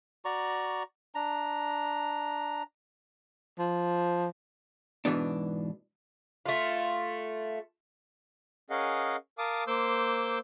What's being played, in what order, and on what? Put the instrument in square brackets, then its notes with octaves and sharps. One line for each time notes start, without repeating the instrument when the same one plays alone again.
[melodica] F#4 D5 A#5 C#6
D4 A#5
[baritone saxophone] F3
[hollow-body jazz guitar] G#2 B2 E3 B3 D4
[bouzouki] A3 F4
[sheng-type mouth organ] C#4 G#4 A#4 D#5 F5 F#5
A#4 F5 A5 D6 D#6
A#3 C5 C6 D6 E6 G6